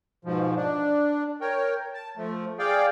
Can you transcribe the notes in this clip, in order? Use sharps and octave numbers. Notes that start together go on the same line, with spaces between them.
G#2 B2 F3
D4
A#4 C#5 G5
A5
F3 A3
G#4 D5 F5 G5